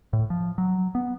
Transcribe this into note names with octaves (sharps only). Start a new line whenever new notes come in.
A2
F3
F#3
B3